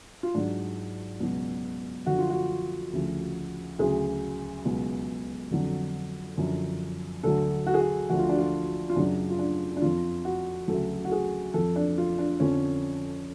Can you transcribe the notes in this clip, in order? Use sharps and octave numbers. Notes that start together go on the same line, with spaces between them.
F4
G#2 F#3 D4
C#2 B2 F#3
F#2 D3 F3 F#4
F4
F#4
D2 C#3 F3
D2 C#3 F#3 G#4
C#2 B2 F#3
F2 D3 F#3
F#2 D3 F3
D2 D3 F#3 A4
F#4
G#4
F#4
D2 D3 F3 F#4
F4
D4
F4
F4
F#2 C#3 F#3 D4
F4
D4
D4
F2 F3 F4
F#4
D2 C#3 F#3 A4
F#4
G#4
F2 F3 A4
D4
F4
D4
F2 D3 F3 C#4